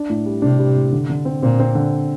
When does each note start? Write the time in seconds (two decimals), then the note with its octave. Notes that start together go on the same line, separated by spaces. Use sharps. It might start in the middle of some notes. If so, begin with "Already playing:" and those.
Already playing: D4
0.10 A2
0.26 G3
0.42 C3 D4
0.59 G3
0.75 A2
0.93 D3
1.10 D3
1.25 C4
1.42 A#2 C4
1.59 C4
1.75 D3